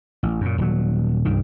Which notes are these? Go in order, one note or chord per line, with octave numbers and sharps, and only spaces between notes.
A1
F#2 A#2
D#1 F#3
C2 G2 D#3